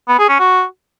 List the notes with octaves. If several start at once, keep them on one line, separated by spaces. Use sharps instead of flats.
B3
G#4
C#4
F#4